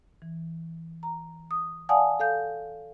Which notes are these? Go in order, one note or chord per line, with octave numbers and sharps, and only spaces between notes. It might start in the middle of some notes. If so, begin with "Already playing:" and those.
E3
A#5
D#6
D5 F5 F#5 G#5 A5 D#6
A4 F5 G6